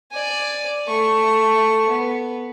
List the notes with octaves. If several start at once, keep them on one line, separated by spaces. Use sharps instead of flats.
D5 G#5
A3 C#6
B3